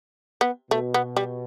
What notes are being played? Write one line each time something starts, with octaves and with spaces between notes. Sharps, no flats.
B3
B2 A3
B3
G3